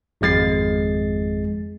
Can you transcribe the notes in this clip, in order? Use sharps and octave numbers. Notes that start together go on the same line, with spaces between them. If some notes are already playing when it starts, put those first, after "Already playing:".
G#1 F2 G#3 A6 C7